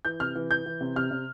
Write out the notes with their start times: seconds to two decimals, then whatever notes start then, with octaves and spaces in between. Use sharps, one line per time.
0.05 E3 G6
0.20 C3 F6
0.35 E3
0.51 E3 G6
0.66 E3
0.81 C3
0.96 C3 F6
1.11 C3